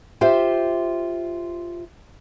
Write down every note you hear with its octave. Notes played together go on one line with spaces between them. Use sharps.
F4 G4 C5 E5